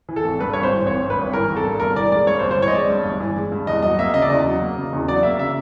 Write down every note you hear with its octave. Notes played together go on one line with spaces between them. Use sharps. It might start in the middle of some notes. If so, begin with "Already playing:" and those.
E3
A4
G#1
G2 B4
G#1 C#5
C5
E3
G#1 C#5
G2
B4
G#1
E3 A#4
G#1
A4
G2
G1 A#4
E3 D5
G#3 D5
G2 C#5
C5
G1
C5
E3 C#5
D#5
G#3 D5
G2
G1
E3
G#3
G2
E2 D#5
F#3 D#5
A#3 E5
C#3 D#5
D5
E2 D#5
F#3
A#3
C#3
E2
F#3 D5
A#3 E5
C#3 E5